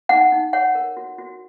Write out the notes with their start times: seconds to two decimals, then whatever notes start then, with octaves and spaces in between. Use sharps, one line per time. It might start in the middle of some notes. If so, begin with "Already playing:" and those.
0.09 D#4 F#5
0.32 D#4
0.53 C#5 F#5
0.75 A#4
0.97 F#4
1.18 F#4